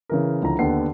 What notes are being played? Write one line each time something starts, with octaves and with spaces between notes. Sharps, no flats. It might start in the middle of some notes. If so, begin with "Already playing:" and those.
C#3 E3 A#4
C#2 D3 F3 E4 A#5
D#2 D3 B3 F#5 C7